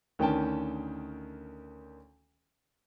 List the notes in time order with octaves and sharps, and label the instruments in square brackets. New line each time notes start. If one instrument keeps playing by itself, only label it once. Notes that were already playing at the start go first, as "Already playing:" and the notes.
[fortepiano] D2 D#3 C#4 G5 A5